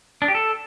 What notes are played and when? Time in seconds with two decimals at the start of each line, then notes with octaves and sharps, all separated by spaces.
0.22 D4
0.28 G4
0.35 A4